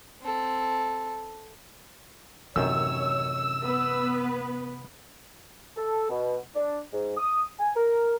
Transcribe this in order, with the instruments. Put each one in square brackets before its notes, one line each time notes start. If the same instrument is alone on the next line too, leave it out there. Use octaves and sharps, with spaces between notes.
[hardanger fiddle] C4 A4
[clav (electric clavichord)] A1 F#2 D#3 [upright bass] C3 [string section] C#5 [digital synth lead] E6
[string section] B3 B4
[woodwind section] A4
B2
D4
G#2
D#6
G#5
A#4